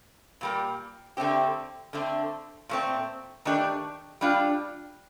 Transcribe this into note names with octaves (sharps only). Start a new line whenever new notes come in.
A#2 G3 A#3
D3 A3 C4 G4
D3 A3 C4
A#2 A3 C4
D#3 A3 D4 G4
G3 D4 F4